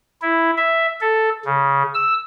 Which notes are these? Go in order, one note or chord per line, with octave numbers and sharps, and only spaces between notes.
E4
E5
A4
C#3
E6